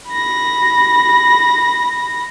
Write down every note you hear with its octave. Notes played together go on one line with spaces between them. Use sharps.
B5 A#6